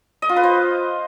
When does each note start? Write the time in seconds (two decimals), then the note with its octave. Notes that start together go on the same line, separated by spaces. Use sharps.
0.22 D#5
0.29 F4
0.36 B4
0.44 C5